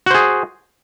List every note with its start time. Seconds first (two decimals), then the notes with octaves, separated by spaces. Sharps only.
0.06 F#4
0.10 C5
0.15 G#4